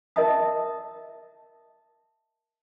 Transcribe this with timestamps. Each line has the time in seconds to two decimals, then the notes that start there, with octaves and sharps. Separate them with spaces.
0.16 A#4 D#5 E5 A5 D#6